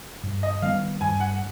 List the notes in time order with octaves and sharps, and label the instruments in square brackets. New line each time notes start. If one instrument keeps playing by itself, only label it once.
[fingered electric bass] G2
[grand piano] D#5
[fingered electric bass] D#3 G3 B3 [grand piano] F5
[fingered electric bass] G2 [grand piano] G#5
[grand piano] F#5